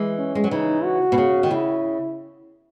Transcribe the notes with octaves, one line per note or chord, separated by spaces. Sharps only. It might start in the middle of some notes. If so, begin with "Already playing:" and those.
Already playing: E3 G#3
C#4
G#3
F#3
C#3 E3 D#4
F#4
B2
C#3
D#3
C#3 E4